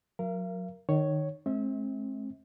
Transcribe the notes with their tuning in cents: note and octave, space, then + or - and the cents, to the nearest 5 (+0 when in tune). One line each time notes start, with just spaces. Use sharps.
F#3 -25 A#4 +0 F5 -45
D#3 -20 C#5 +0
G#3 +45 C4 +35 E5 -35